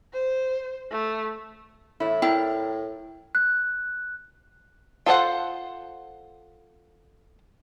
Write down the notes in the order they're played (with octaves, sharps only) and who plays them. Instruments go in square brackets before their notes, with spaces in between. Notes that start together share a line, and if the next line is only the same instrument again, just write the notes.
[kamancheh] C5
A3
[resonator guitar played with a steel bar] E2 E4 [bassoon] A2
[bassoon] A2 [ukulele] E4 [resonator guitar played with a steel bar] A#4 D5 A#5 [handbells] G5
[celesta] F#6
[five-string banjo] F4 A4 C5 F#5